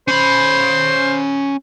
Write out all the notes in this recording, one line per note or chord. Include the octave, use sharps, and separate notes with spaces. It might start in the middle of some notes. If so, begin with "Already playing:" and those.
C#4 C5 B5